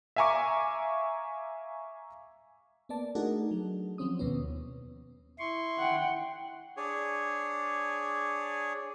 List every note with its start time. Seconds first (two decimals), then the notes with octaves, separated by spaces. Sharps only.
0.16 E5 F5 G#5 A#5 C#6 D6
2.89 A#3 B3 D5 A5
3.15 A3 D4 D#4 F#4 G#4 A#4
3.51 F#3
3.98 F3 F#3 C4 C#4 D#6
4.19 D#2 B2 B3 C#4
5.39 E4 C6 C#6
5.78 F#5 G5
6.77 D4 G#4 C#5